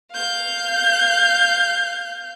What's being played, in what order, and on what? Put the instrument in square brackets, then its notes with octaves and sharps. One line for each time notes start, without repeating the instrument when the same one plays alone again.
[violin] F5 G6